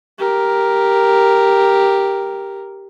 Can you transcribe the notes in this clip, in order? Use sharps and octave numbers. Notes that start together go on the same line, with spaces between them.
G4 A#4